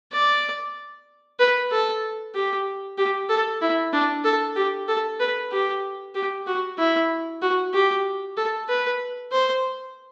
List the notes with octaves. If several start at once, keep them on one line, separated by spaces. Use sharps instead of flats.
D5
B4
A4
G4
G4
A4
E4
D4
A4
G4
A4
B4
G4
G4
F#4
E4
F#4
G4
A4
B4
C5